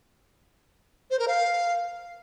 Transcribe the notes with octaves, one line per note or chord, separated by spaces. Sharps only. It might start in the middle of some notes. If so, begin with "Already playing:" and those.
C5
A#4
F5